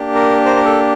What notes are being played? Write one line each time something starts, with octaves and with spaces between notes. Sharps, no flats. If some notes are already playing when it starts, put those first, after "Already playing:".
Already playing: A#3 D4 G4
A#4
A#4 C5
A#4
A4